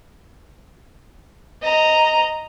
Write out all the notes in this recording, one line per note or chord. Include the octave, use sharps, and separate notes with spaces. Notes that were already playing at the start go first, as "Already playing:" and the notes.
D#5 A#5